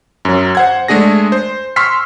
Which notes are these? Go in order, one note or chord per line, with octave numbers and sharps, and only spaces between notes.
F#2 F#3
C5 F#5 G#6
G#3 A3 D4 G#4 A#6
C5
C6 C#6 E6 F6 B6 C7